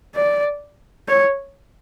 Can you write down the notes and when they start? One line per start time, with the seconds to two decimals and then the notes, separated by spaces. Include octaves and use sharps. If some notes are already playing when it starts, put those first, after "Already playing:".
0.15 D5
1.08 C#5